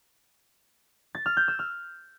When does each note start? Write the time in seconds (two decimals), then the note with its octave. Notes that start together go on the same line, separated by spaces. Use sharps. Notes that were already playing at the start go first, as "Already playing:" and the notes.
1.15 A6
1.26 F6
1.37 G6
1.48 E6
1.59 F6